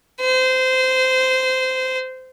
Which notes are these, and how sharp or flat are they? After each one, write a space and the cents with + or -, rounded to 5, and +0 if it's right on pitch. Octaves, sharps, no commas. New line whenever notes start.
C5 -20